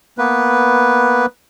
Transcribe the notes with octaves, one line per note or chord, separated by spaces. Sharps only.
A#3 B3 B4